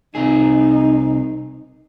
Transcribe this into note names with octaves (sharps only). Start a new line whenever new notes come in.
C2 C4 D#4 G#4